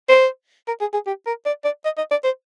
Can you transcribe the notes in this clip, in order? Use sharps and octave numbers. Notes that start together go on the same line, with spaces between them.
C5
A#4
G#4
G#4
G4
A#4
D5
D5
D#5
D#5
D5
C5